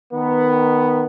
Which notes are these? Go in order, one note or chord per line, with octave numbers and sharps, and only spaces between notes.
D#3 B3